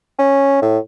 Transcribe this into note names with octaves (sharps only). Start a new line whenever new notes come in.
C#4
A2